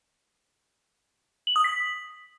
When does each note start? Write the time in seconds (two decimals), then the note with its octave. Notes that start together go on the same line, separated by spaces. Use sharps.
1.47 F#7
1.56 D#6
1.64 B6